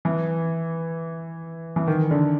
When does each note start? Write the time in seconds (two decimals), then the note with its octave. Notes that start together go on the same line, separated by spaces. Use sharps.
0.05 E3
1.76 E3
1.87 D#3
2.11 D3